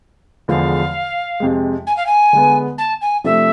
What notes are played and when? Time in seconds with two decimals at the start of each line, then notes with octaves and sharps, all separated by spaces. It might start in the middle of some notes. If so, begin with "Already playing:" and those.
0.48 E2 D3 F3 G#3 F5
1.40 F2 C3 G#3
1.87 G#5
1.96 F5
2.06 G#5
2.33 D3 G#3 B3
2.78 A5
3.01 G#5
3.24 C3 F3 A3 D4 A4 E5